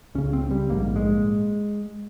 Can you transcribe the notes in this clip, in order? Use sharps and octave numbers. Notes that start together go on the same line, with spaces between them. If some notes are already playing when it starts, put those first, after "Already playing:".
C#2 C#3 C#4
C4
G3
A#1 G#2 A#3
G#3